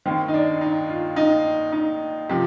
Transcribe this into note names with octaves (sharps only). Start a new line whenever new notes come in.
D#2 D#3 C4
D#4
D4
D#4
F4
D#4
D#4
C3 F3